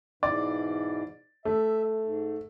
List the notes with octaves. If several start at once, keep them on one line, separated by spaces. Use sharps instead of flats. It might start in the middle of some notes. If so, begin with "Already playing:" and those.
G#2 B2 E3 D5
A3 E5
G#2